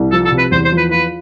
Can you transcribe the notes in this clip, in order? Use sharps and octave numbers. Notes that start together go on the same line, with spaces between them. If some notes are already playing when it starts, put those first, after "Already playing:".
Already playing: C2
F3 A4
A4
C3
B4
E2 C5
C5
F3
B4
F4 B4